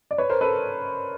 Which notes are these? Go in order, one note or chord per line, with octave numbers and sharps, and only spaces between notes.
D5
B4 C#5
A#4 C5
A4 B4